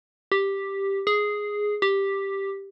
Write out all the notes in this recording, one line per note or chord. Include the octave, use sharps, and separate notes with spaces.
G4
G#4
G4